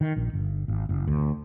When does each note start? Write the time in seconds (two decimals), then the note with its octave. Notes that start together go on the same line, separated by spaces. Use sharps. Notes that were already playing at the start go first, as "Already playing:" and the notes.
0.01 D#3
0.16 A#1
0.33 G1
0.68 G#1
0.89 F#1
1.07 D2